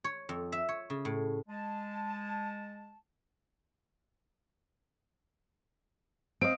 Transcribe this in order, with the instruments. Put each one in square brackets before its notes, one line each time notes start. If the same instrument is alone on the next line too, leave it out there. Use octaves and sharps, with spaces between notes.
[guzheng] C#5
F2
E5
C#5
C#3
A2
[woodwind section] G#3 A5
[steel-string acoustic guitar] C4 [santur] D#5 F5 [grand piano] D7